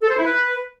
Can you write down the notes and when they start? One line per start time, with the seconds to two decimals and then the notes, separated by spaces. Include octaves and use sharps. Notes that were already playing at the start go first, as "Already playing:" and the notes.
0.03 A4
0.10 C5
0.18 E4
0.25 B4